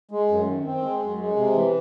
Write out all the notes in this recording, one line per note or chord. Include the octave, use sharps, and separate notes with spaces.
G#3
F#2
D#3
C4
G#3
F#2
G#3
C3
E3